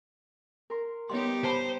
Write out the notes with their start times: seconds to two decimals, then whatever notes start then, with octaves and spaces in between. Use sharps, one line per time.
0.70 A#4 C6
1.09 G3 B3 D#4 G4 C#5 D#5 C6
1.44 C5 A5 B5